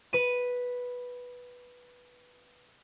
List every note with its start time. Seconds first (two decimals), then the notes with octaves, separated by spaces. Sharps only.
0.13 B4 D#7